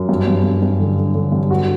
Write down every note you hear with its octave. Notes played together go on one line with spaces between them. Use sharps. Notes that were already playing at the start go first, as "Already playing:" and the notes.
Already playing: F#2
G2
G2
G2
G2
D3
D3
D3
G2
F#4